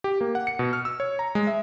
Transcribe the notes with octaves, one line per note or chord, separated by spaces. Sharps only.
G4
A#3
F#5
C#7
B2
F6
E6
C#5
A#5
G#3
E5